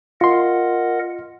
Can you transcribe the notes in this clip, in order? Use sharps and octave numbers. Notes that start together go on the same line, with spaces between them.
F4 A#4 D#5 F#5 C6